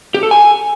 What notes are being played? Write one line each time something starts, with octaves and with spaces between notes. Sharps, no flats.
G4
A4
G#5